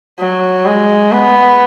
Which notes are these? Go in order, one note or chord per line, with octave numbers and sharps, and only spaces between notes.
F#3
G#3
B3